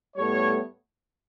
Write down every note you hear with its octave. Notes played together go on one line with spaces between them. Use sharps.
A2 G3 B3 A4 C#5